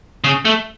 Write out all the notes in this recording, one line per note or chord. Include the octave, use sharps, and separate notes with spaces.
C#3
A3